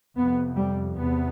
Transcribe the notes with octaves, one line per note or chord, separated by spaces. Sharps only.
F2 C3 B3
G3
E2 C3 B3